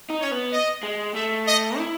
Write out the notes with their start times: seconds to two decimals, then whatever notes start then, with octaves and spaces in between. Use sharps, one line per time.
0.10 D#4
0.20 C#4 C#5
0.31 B3
0.52 D#5
0.83 G#3
1.15 A3 E5
1.47 D#5
1.78 E4